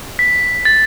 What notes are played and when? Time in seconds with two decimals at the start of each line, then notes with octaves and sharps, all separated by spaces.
0.19 B6
0.65 A6